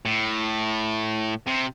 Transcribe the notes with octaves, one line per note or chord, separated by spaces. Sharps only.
A2
C3